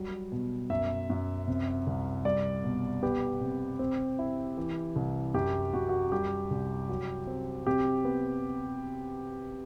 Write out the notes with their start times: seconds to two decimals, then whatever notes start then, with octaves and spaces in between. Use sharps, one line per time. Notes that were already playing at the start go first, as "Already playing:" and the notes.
Already playing: F#3 G3
0.32 B2
0.70 F#2 E5
1.10 F#2
1.48 C3
1.87 C2
2.25 G3 D5
2.64 B2
3.03 B3 G4
3.41 C3
3.79 C4
4.19 E4
4.57 E3
4.96 C2
5.34 F#2 G4
5.73 F#2 F#4
5.89 F#4
6.12 G3 G4
6.51 C2
6.89 F#3
7.27 C4
7.67 C3 G4
8.05 B3